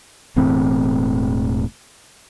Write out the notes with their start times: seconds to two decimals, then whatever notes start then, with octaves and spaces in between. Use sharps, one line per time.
0.36 E1 E2 A2 C4